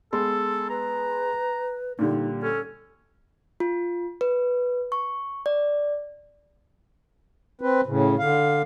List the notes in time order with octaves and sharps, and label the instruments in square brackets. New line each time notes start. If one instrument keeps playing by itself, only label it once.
[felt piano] G#3 B3 C6 [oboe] A4
[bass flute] B4 [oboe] A#5
[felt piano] A#2 D3 G3 [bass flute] D#4
[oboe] C#4 [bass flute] A4
[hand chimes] F4
B4
C#6
D5
[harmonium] C4 B4
A2 C#3
D3 F5